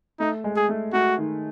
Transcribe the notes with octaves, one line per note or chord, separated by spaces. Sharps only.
A3 D#4
G#3
G#4
A3
A3 F#4
D#3